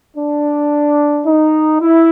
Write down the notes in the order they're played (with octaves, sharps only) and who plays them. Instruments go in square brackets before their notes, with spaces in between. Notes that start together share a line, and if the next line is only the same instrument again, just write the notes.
[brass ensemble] D4
D#4
E4